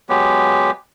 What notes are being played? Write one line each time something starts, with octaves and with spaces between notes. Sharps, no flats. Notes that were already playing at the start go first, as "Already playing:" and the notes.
F#3 G#3 B3 G4